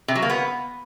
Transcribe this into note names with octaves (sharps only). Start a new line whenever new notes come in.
C3
F#3
A#3
B3